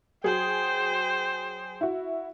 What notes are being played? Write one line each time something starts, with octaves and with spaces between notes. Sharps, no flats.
F#3 F#4 G#4 C5 G5
E4 F#4